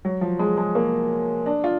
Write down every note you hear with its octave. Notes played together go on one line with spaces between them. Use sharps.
F#3
F3
G#3
G#3
A#3
D4
F4